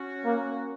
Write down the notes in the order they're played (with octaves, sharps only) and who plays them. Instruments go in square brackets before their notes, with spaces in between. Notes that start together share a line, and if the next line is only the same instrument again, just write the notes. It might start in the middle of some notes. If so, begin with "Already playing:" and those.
Already playing: [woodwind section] C#4 F#4
[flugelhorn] A#3